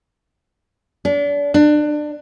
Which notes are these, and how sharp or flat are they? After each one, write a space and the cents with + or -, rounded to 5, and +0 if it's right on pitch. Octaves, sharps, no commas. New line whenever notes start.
D4 -35
D4 +25